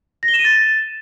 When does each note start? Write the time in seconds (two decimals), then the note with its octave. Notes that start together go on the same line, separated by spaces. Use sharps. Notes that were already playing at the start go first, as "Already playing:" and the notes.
0.23 A#6
0.28 G7
0.34 E7
0.39 D#7
0.44 A6